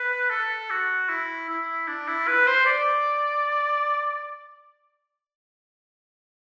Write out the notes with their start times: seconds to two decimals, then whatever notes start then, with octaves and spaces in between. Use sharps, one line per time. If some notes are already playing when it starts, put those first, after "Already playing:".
Already playing: B4
0.30 A4
0.70 F#4
1.09 E4
1.49 E4
1.88 D4
2.08 E4
2.27 B4
2.47 C5
2.66 D5